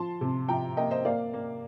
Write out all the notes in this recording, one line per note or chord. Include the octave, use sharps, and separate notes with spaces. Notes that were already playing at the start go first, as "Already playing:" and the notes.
Already playing: F3 A5 C6
C3
F3 G5 A#5
A#3 D#5 G5
C5 D#5
A#3 D5 F5
A#3